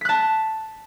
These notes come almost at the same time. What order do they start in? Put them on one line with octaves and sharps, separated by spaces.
B6 F#6 A5